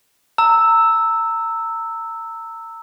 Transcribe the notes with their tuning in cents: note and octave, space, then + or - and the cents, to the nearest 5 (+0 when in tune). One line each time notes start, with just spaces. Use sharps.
A#5 -30 E6 -5